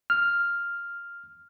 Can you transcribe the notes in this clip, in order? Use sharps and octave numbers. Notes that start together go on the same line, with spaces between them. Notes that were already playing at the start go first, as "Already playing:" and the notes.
F6